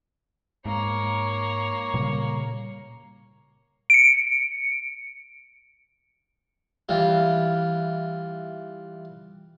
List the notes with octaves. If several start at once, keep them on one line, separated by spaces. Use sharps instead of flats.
G#2 A#3 C#5
A#2 C#3 G3
C#7 D7
E3 G3 F4